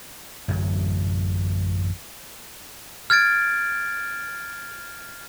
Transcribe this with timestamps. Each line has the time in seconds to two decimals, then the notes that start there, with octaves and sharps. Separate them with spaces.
0.48 A1 F#2 D3 F#3
3.10 F6 G#6 A6 D7